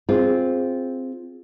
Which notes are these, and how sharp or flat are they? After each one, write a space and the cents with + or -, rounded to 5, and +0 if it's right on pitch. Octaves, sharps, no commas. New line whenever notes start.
C4 +0 F4 +0 G#4 +0